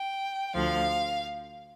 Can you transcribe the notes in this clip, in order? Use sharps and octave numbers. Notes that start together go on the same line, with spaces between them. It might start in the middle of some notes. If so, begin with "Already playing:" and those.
Already playing: G5
D2 D3 F3 F5